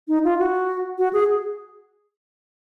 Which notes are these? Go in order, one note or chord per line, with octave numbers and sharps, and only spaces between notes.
D#4
F4
F#4
F#4
G#4